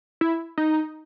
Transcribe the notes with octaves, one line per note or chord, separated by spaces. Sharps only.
E4
D#4